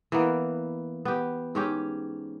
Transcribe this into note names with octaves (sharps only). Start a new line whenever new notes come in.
E3 A#3 B3
B3 G4
G#2 C#4 G4